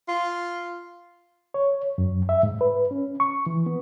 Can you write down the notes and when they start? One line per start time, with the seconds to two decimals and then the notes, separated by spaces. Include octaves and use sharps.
0.08 F4
1.54 C#5
1.98 F#2
2.29 E5
2.43 G#2
2.61 B4
2.91 C#4
3.20 C#6
3.46 E3
3.66 B3